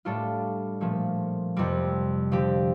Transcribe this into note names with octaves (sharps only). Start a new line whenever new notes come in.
A2 G3 D4 F4 A4
A#2 F3 A3
F2 C3 G3 C4
D3 F3 C4 G4